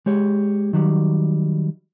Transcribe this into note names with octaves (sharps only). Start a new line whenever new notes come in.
G#3 G4 C#5
D#3 F#3 G3